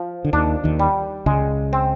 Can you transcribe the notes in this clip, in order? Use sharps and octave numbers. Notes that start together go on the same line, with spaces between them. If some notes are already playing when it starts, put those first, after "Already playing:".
Already playing: F3
D3
D#2 D#3 D4
D#2 D#3
G3
C#2 C#3 G#3
C4